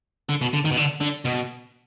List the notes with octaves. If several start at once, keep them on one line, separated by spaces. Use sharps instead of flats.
D3
B2
D3
D#3
B2
D3
D3
B2